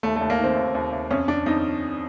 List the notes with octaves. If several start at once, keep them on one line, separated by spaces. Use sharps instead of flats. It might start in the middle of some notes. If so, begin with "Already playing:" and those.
D#2 A3
A3
D#2
A#3
D#3 C4
D#2
D#2
D#2
F2 C#4
F2 D4
F2 D#4